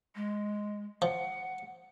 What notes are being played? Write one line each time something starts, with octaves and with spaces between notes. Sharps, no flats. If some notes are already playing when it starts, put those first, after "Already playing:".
G#3
F3 F#5